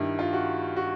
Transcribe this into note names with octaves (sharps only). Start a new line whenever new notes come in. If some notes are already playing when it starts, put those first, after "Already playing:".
Already playing: G2 D#3 G3 E4
F4
F#4
F#4